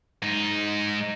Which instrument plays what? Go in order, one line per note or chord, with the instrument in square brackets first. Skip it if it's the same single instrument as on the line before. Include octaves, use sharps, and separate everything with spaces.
[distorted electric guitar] G#2 D#4